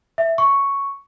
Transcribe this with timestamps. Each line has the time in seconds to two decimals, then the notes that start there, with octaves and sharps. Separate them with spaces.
0.18 E5
0.38 C#6